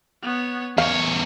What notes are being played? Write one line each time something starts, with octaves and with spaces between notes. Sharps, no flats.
B3 C#5
E2 C#5 F5 C#6